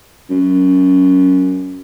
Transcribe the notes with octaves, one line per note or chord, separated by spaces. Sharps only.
F#2